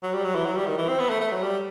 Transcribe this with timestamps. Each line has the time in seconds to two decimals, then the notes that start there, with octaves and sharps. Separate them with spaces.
0.03 F#3
0.14 G3
0.24 F#3
0.35 E3
0.46 F#3
0.56 G3
0.67 D#3
0.78 E3
0.88 C4
0.99 B3
1.10 A3
1.21 A3
1.32 F#3
1.42 G3